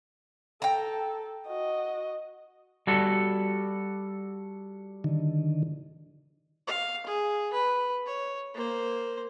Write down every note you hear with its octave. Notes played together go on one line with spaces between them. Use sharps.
A4 G5 A#5
F#4 D#5
G3 F#4 A4
D3 D#3
F5
G#4
B4
C#5
A#3 C5